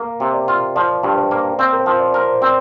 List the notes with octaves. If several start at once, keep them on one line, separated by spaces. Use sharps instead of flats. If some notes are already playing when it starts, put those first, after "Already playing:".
Already playing: A#3 A#4
C3
D5
F4
F3 D5
G2
C5
A#3
C4 D5
A#4
C5
F3
D5
A#4
C5
C4 D5